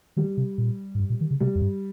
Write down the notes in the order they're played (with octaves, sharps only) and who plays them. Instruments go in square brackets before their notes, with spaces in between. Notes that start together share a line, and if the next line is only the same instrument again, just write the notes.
[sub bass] D#3 [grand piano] G3
[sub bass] C3
A#2
G#2
G2
A#2
D#3
C#3
[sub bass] C3 [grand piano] G3
[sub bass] F2
G2